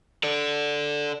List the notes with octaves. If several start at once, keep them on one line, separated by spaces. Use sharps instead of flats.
A4 D5